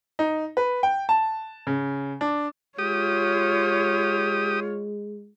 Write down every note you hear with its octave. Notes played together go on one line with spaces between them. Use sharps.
D#4
B4
G5
A5
C#3
D4
G#3 F4 G4 C#5 D#6